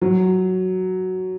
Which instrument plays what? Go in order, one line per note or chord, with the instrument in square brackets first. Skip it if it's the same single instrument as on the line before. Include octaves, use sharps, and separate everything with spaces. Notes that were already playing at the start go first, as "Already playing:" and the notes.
[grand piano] F#3